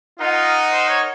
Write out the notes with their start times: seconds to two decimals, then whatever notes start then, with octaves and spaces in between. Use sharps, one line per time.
0.19 D#4 F4 A#4 D#5 F#5
0.72 C5
0.89 C#5